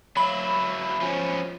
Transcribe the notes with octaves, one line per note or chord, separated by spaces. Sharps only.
F#3 E4 B5
F3 C#4